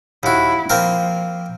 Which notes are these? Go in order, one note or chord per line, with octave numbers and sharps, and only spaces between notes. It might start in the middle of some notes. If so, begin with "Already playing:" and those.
D#2 E4 F#4
F3 A#3 C4 A#4